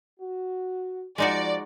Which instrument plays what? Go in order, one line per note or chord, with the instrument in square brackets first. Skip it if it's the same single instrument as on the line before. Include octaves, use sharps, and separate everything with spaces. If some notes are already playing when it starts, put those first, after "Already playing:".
[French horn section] F#4
[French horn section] F3 [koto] G#3 D#4 F#4 [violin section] D5